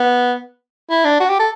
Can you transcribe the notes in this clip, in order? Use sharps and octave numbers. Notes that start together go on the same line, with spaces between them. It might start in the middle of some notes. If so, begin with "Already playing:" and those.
Already playing: B3
E4
D4
F#4
G4
A4